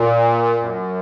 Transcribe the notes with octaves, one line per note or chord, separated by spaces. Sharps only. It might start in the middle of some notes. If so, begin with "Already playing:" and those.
Already playing: A#2
F#2